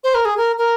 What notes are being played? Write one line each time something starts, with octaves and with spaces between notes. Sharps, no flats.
C5
A#4
G#4
A#4
A#4